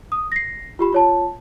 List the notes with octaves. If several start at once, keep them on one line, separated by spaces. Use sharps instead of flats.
D#6
A#6 C7
F4 G4 B5
F4 C#5 A5